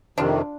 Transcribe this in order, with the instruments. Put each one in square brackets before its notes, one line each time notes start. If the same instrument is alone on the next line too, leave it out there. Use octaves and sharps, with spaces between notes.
[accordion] F2 C3 D#3 [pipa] D4 F4